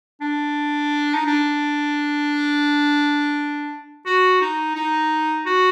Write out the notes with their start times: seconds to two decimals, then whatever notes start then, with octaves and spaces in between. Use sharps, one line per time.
0.21 D4
1.14 D#4
1.26 D4
4.06 F#4
4.41 D#4
4.76 D#4
5.46 F#4